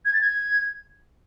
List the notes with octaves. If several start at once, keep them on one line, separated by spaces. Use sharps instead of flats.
G#6
A6
G#6